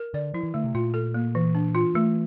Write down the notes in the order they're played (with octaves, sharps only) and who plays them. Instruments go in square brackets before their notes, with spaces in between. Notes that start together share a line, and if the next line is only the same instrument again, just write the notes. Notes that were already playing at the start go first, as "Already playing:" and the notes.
Already playing: [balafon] A#4
[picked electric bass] D3 [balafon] D5
[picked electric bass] F3 [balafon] E4
[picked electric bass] E3
[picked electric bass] D3 [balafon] A3
[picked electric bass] C3
[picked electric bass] A#2 [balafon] F4
[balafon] A4
A#3
E3
D4
F4
[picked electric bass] E3 [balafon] A3